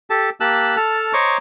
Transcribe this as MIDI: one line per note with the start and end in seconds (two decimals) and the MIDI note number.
0.10 0.30 67
0.10 0.30 69
0.10 0.30 81
0.40 0.76 58
0.40 0.76 67
0.40 0.76 81
0.40 0.76 88
0.40 0.76 90
0.76 1.13 69
0.76 1.13 81
0.76 1.13 89
1.13 1.38 72
1.13 1.38 73
1.13 1.38 75
1.13 1.38 82
1.13 1.38 85
1.13 1.38 86